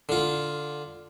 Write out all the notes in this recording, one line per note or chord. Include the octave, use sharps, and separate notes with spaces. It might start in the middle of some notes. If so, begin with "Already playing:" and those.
D3 F4